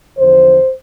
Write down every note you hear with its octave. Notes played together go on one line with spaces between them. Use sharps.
E2 D3 F3 C5